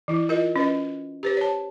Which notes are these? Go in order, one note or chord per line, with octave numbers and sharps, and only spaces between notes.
E3 E4
F4 A#4 D#5
C#4 B4 D#5
G4 B4 C5
C#5 A5